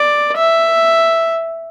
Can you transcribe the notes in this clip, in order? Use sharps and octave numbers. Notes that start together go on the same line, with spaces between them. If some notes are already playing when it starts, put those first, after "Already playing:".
Already playing: D5
E5